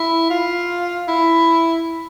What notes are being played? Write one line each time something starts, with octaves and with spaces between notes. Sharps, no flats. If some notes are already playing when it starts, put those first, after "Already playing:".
Already playing: E4
F4
E4